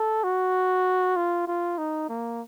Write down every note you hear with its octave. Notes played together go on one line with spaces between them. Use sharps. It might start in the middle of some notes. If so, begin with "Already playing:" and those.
Already playing: A4
F#4
F4
F4
D#4
A#3